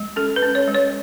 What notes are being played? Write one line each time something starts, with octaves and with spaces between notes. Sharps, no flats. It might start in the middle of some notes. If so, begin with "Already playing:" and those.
Already playing: G#3
C#4 A4
B4
C#4
C#5
G#3
C#5